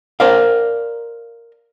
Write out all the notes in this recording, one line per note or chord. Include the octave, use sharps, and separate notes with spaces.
A#4 C5 D5 F5